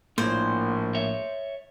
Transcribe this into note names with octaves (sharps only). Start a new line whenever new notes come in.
A#1 A2 A#3 C5
C#5 E5